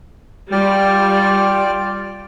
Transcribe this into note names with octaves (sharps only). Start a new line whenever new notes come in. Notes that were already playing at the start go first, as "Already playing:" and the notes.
G3 F4 D5 G5 F6